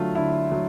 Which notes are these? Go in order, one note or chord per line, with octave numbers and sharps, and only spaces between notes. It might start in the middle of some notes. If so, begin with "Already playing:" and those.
Already playing: D3 F#3 A3 F4
D3 E4
F#3